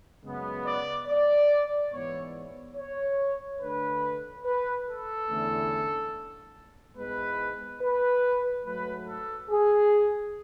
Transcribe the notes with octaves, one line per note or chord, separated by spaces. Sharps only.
F#2 C#3 G#3 B3
D5
D5
G#2 E3 B3 E4 C#5
C#5
D3 A3 D4 B4
B4
A4
E2 D3 A3 C#4 E4
G#2 G#3 B3 E4 B4
B4
G#2 F#3 A3 B4
A4
G#4